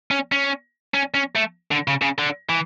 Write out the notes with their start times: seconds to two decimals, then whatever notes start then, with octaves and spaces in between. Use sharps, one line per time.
0.11 C#4
0.32 C#4
0.94 C#4
1.14 C#4
1.35 A3
1.71 D3
1.88 C#3
2.02 C#3
2.19 D3
2.49 E3